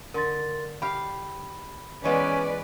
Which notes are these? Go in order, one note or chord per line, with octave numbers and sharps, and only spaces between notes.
D3 A#4 C6 A6
G4 F5 B5
E3 G#3 B3 C#4 B4 D5